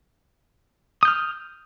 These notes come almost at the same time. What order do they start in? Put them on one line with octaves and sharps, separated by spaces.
D#6 G6 F6